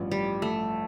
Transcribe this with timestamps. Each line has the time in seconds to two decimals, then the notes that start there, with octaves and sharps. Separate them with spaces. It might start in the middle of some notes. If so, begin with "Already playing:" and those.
Already playing: A1 G2 F3
0.12 G3
0.42 A3